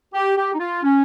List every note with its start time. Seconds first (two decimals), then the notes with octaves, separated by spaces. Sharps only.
0.14 G4
0.37 G4
0.54 D#4
0.59 F4
0.83 C#4